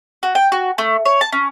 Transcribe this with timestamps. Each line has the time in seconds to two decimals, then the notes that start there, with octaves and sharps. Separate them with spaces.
0.23 F#4
0.35 G5
0.52 F#4
0.78 A3
1.05 C#5
1.21 A5
1.32 C#4